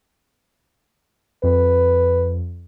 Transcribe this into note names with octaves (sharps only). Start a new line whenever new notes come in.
F2 B4